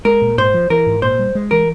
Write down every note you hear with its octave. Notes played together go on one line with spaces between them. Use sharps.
G#3 A#4
A#2
G#2 C5
F3
E3 A#4
G#2
A#2 C5
G3
G#3
E3 A#4